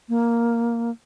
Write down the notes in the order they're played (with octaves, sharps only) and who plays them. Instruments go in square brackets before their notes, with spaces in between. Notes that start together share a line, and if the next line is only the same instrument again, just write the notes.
[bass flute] A#3